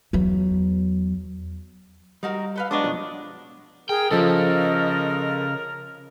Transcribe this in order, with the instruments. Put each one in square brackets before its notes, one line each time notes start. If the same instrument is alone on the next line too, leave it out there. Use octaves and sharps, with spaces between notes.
[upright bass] E2 F#3
[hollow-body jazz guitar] G3 [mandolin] D#4 F#4 A#4
[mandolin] A4 B4 F5
[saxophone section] F#3 B3 D4 [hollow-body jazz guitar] G#3 [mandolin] D#5 C#6 D#6
[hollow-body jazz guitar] F#2 B2 F3
[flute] G#4 [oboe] A#4 [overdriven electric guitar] G5
[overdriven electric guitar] C#3 C#4 [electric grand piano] F3 A4 [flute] D#5